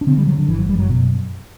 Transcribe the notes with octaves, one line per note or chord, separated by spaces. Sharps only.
D4
D3 C4
G3
D3 F#3
D3
G1 E3
F#3
F#2 G3
F#3
B2